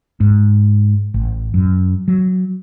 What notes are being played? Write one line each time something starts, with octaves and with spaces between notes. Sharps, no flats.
G#2
A1
F#2
F#3